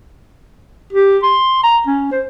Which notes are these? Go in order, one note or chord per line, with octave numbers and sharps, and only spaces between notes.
G4
C6
A#5
C#4
C5